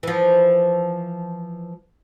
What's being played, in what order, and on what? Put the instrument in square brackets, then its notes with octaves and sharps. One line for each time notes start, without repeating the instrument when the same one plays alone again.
[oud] E3 F3